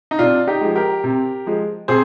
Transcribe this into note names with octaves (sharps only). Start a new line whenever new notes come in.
D#4
C3 D4 F4
D#4 G4
F3 G#3
G4 A#4
C3
F3 G#3
C3 G#4 C5